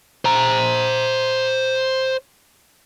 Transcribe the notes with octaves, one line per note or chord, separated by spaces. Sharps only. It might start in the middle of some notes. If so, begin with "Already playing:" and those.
C5 A#5